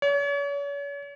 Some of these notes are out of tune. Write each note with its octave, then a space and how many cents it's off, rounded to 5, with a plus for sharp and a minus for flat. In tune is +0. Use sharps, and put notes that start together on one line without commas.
C#5 +40